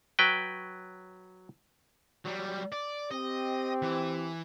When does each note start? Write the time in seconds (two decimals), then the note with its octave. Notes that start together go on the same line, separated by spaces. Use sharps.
0.19 F#3 B4 G5
2.26 F#3 G3
2.72 D5
3.11 C4 G4 D#5
3.82 E3